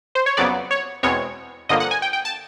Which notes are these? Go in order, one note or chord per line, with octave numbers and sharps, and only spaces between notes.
C5
C#5
F2 C#3 F#3 B3 D5
C#5
E2 B2 G#3 C4 C#5
G2 D3 F3 A#3 D#5
F#5
G#5
G5
G5
A5